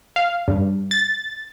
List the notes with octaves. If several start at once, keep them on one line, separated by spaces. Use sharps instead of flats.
F5
G2
A6